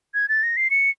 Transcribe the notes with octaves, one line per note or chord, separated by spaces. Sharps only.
G#6
A6
A#6
C7
C#7